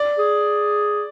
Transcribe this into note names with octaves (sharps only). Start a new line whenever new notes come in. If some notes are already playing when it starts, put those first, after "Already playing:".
Already playing: D5
G#4